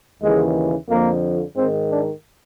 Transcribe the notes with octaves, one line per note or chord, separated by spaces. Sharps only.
D#2 C#3 E3 G#3
F2 D3 F3 A#3
G#2 D#3 C4
D4